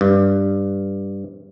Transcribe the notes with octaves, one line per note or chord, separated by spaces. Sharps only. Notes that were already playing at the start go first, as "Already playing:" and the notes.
G2